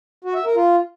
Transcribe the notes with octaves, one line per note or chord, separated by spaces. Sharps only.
F#4
E5
A#4
F4